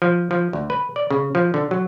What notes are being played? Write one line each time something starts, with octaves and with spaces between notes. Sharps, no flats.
F3
F3
D2
B4
D5
C#3
F3
D3
F#3